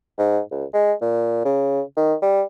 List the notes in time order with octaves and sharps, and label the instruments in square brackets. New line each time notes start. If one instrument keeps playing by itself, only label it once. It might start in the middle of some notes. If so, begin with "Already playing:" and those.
[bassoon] G#2
C#2
G#3
A#2
C#3
D#3
G3